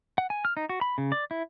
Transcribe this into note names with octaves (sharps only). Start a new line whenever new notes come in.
F#5
G#5
F6
D#4
F#4
B5
C#3
D5
E4